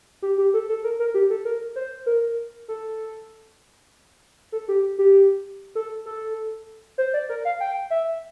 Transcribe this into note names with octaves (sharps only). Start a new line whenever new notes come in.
G4
G4
A4
A4
A#4
A#4
G4
A4
A#4
C5
A#4
A4
A4
G4
G4
A4
A4
C5
D5
A#4
F5
G5
E5